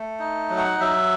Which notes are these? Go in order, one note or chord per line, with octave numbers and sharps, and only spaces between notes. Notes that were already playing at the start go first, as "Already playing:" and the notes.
Already playing: A3
D#4
F#3
F#5
F#3 E5